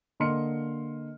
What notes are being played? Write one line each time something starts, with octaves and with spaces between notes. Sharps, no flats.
D3 A#3 D#5 C6 F6 C#7